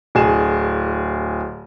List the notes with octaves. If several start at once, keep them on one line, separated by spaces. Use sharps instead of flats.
D1 G#4 E7